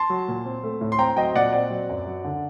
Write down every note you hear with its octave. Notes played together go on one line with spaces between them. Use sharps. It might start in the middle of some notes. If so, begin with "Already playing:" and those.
Already playing: A5 C6
F#3
A#2
C4
A3
A2
C6
C4 G5 A#5
F#3 D#5 G5
A#2 D5 F#5
C4 D5
F#3
F#2
F#3
D3